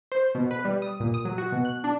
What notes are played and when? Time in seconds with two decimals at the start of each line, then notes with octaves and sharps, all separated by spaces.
0.12 C5
0.35 B2
0.51 B4
0.65 G3
0.82 D#6
1.00 A#2
1.14 D#6
1.25 F#3
1.38 F#4
1.52 B2
1.65 F#6
1.84 D4